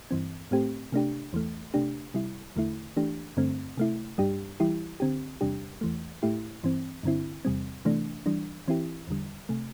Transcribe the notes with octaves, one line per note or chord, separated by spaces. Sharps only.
G2 E3 C4
A2 A3 C4 G4
C3 A3 D4 G4
E2 E3 A3
C3 A3 D4 G4
C3 G3 E4
E2 D3 A3 E4
E3 A3 D4 G4
G2 D3 A3 C4
C3 A3 E4
G2 G3 D4 G4
E3 G3 E4 G4
D3 C4 G4
E2 C3 G3 D4 G4
E2 E3 A3
A2 A3 E4 G4
G2 E3 C4
G2 D3 C4 E4
E2 C3 G3 C4
C3 E3 A3 D4
E3 G3 D4
E3 C4 E4 G4
E2 D3 G3
C3 A3